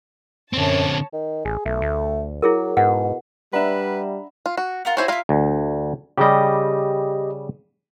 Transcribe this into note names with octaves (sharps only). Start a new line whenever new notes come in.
F#2 D3 C4 C#5 A5
D#3
A1 G#4
B1 A3
D2
F#3 E4 G#4 A#4
G#2 B2 F#5
G3 D4 B4 E5 F#5 A#5 B5
F4
F#4
F4 A#4 F#5
E4 F#4 C5 C#5 G#5
E4 F4 E5 F5 A#5
D2
C#3 G3 G4 D#5